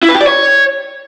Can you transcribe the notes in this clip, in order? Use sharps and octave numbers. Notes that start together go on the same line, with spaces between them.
E4
B4
G4
D5
C#5